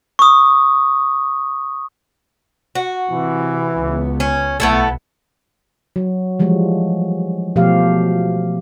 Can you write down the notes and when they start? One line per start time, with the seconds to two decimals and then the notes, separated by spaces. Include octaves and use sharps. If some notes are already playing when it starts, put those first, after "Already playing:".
0.19 C#6 D#6
2.75 F#4
3.10 C3 E3
3.78 C#2 B3
4.20 C#4
4.60 B1 A3 B3 E4 A4
5.96 F#3
6.39 E3 F3 G3 G#3
7.56 B2 F3 A3 G4 F5